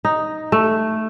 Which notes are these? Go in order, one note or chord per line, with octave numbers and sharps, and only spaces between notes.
D#4
A3